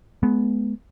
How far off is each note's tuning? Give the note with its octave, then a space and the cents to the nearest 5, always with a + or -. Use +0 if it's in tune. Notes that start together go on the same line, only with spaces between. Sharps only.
G#3 +35 B3 +0